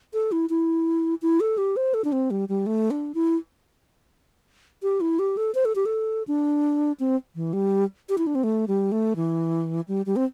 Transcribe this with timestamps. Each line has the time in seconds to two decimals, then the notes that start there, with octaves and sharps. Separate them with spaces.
0.14 A4
0.32 E4
0.50 E4
1.22 E4
1.40 A4
1.58 G4
1.76 C5
1.94 A4
2.05 D4
2.12 C4
2.31 G3
2.49 G3
2.66 A3
2.91 D4
3.15 E4
4.83 G4
5.01 E4
5.19 G4
5.37 A4
5.55 C5
5.65 A4
5.75 G4
5.86 A4
6.28 D4
7.00 C4
7.35 E3
7.53 G3
8.09 G4
8.18 E4
8.27 D4
8.35 C4
8.44 A3
8.68 G3
8.92 A3
9.16 E3
9.88 G3
10.06 G3
10.16 C4